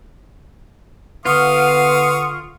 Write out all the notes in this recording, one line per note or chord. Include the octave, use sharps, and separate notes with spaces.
D3 B3 F4 F5 C#6 D#6